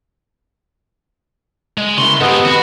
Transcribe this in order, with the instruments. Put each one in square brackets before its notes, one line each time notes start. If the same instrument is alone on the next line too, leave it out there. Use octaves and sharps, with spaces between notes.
[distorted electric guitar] G#3
[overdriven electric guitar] C#3 E4 [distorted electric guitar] C6 [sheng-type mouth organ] C#6
[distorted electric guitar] G#2 C4 [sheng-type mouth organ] B3 D#5 F#5 [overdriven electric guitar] G4 A4
[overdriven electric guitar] D#2 B5 [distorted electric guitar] F#4